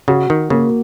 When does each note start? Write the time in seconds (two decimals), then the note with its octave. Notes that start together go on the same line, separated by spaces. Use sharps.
0.08 C#3 F#4
0.30 D#3
0.50 C#3 A#3